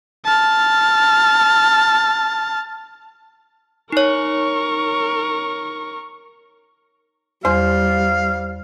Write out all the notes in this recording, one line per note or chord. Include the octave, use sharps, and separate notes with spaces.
A5 F6
D#4 A#4 C#5 C#6
E2 G3 C5 F5